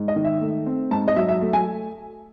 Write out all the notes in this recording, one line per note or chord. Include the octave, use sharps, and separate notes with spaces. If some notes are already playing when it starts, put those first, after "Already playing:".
Already playing: G#2
D#5
D#3
E5
A3
C4
G#2 A5
D#5
F#3 E5
E5
A3
G#5